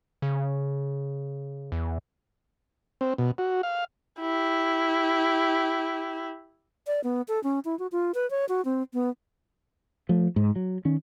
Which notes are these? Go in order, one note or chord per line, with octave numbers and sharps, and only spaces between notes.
C#3
E2
C4
B2
F#4
F5
E4 G4
D5
B3
A4
C#4
E4
F#4
F4
B4
C#5
F#4
C4
B3
F3 A3
G#2
F#3
D#3 C#4